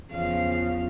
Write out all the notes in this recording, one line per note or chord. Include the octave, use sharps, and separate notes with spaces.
E2 C#3 F3 F5